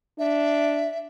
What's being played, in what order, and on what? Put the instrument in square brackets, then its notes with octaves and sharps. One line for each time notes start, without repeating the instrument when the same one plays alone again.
[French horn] D4 [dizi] E5